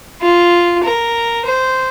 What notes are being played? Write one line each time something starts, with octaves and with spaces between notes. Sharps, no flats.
F4
A#4
C5